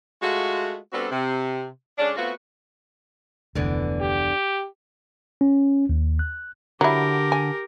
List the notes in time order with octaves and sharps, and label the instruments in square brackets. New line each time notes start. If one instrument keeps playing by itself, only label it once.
[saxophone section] G#3 A3 F4 F#4
G3 B3 C4 D4 F#4 A4
C3
D3 G#3 C#4 D4
A3 B3 C4 F4 F#4
[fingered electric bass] F1 D2 [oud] D3 E3 B3
[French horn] G4
[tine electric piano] C#4
D#2
F#6
[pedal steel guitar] D3 [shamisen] F#3 E4 [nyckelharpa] G4 A#4
[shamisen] G#5